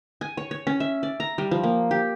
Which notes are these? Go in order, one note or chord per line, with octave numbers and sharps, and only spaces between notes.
G#5
C#5
C#5
C#4
E5
D5
A#5
G3
F3
A#3
G4